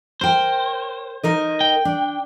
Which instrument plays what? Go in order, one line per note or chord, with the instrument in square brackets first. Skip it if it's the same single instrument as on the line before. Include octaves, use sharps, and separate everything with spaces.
[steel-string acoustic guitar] A#4 G5 [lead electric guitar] C5
[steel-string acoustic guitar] D#4 A#4 D#5
[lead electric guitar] G5
[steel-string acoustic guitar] D4